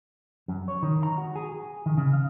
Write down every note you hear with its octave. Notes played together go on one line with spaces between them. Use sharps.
F#2
C#5
D#3
A#5
F#4
G#4
G#4
D#3
C#3
F5